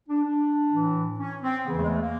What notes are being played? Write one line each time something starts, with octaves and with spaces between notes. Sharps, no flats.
D4
D4
A2 E3
C#4
C4
E2 C#3 E3 B3
A3
G#3
A3
A#3